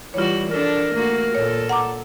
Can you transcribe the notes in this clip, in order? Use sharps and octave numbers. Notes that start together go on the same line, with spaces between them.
E3 G3 F4 F#4 C#5
D4 A4 A#4
A3 A#3 F#4
A#2 A4 C#5
F#5 A#5 D6